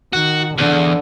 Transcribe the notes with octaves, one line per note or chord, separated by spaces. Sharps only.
D#3 F#4
E2 D3